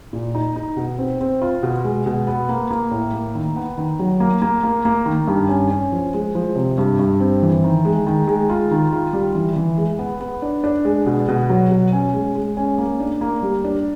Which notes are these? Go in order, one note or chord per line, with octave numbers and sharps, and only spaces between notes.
A#2
D#4
D#4
B2
C4
C4
F4
B2
G#3
B2
B3
A#3
A#3
A2
A#3
D#3
B3
D#3
F#3
A#3
A#3
A#3
A#3
D#3
G2
C#4
C#4
F3
G#3
F3
C3
G2
G2
C4
E3
D#3
G#3
D#3
G#3
F4
D#3
F4
G3
E3
E3
G#3
B3
B3
D4
D4
G#3
B2
B2
F#3
B2
C#4
G#3
G#3
C#4
A#3
D4
A#3
G3
D4